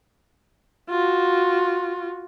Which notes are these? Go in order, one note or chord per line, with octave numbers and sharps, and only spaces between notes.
F4 F#4